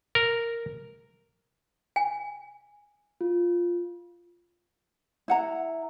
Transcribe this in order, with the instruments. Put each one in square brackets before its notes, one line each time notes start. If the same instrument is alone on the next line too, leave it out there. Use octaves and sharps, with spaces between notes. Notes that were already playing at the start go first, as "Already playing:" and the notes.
[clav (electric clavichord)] A#4
[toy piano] G#5
[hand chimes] F4
[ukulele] E4 F#5 A#5